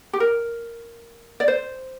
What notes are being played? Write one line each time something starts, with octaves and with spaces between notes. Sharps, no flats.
G4
A#4
D5
C5